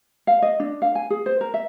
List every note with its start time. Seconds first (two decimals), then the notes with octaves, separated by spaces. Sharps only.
0.27 F5
0.42 D#5
0.60 D4
0.82 F5
0.95 G#5
1.10 G#4
1.26 C5
1.41 A#4
1.54 E5